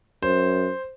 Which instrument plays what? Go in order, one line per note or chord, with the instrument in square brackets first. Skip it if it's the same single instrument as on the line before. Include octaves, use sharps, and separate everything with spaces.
[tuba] F#2 [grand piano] C5